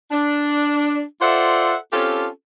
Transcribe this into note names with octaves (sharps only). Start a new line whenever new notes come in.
D4
F4 A4 C5 D5 E5 F#5
C4 C#4 F4 G4 A4